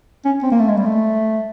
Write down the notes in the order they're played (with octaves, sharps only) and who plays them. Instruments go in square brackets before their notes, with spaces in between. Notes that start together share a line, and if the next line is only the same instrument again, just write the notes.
[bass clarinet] C#4
C4
A#3
A3
G#3
G3
A3